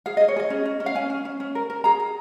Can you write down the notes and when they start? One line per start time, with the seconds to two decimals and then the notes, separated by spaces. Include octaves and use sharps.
0.06 G#4 F5
0.17 D#5
0.21 G#4
0.28 C#5
0.36 G#4 D#5
0.50 C#4
0.65 C#4
0.80 C#4
0.86 F5
0.95 C#4 G#5
1.10 C#4
1.25 C#4
1.40 C#4
1.55 A#4
1.70 A#4
1.84 G#4 A#5
2.00 G#4